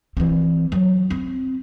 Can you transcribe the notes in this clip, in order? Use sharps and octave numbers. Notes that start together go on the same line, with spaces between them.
E3 C4
F#3
C4